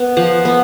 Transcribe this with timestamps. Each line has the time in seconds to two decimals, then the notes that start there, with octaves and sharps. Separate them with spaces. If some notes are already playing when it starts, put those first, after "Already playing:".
Already playing: B3
0.17 F3 F#5
0.45 B3